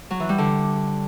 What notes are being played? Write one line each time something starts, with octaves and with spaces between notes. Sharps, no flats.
F#3
E3
G3
D3